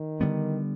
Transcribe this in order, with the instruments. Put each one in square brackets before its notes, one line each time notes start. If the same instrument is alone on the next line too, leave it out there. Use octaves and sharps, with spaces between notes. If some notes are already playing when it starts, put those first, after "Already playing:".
Already playing: [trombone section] D#3
[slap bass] D3 G3 B3 D4